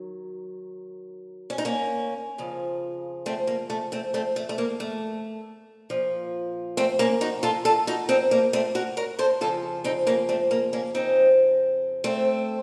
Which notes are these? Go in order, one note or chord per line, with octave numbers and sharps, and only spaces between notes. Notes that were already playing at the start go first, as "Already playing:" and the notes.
Already playing: D#3 F#3
C#4
D#4
A#3 C#4
F2 C#3 F3
A3 C4
A#3
A3
A3 C4
A3 C4
A3
A3
A#3
A3
A#2 F3
A3 C4
A#3 C#4
D#4 F#4
F4 A4
F4 A4
D#4 F#4
C4 D#4
A#3
A3 C4
F#4 A#4
A#4 C#5
A4 C5
F2 C#3 F3 F4 A4
C4 D#4
A#3 C#4
A3 C4
A#3
A#3 C#4
C4 D#4
A3 C4